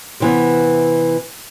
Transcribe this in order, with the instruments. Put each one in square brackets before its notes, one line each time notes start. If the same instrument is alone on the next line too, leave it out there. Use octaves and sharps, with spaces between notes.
[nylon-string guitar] C3 E3 B3